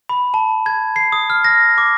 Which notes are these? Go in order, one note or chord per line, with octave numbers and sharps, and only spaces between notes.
B5
A5
G#6
C7
D#6
F6
A#6
D6